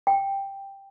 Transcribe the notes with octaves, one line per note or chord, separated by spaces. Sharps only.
G5